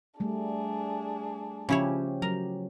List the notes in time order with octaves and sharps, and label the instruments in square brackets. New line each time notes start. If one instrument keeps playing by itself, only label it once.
[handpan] G3 A3 [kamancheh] D4 G#4
[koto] C#3 E4 C#5 [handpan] F3 C#4 G4
[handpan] F#3 [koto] A#4